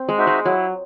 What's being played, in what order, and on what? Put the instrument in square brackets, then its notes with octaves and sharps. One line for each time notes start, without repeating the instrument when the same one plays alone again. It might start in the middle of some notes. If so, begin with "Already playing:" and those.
Already playing: [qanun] C4
G#3
[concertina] D#4 F#4 C5 E5
[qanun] G#3
[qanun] F#3 [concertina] E4